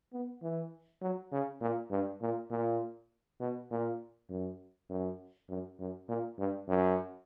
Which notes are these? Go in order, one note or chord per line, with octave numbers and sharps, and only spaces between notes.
B3
E3
F#3
C#3
A#2
G2
A#2
A#2
B2
A#2
F#2
F#2
F#2
F#2
A#2
G2
F#2